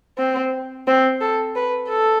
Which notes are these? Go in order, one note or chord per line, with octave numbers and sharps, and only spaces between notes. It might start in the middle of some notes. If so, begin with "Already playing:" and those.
C4
C4
A4
B4
A4